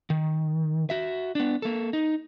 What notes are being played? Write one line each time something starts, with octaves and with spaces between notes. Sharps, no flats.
D#3
F#4 E5
B3 D4
A#3 A4
D#4